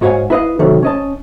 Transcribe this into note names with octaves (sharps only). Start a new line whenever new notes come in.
G#2 F#4 C#5 F5 F#5 G#5
E4 B4 D#5 F5
C3 D#3 F#3 A3
C#4 D#5 A5